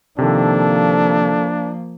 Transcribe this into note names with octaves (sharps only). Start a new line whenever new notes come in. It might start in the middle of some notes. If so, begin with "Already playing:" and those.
C3 D#3 F3 A#3 D4 A4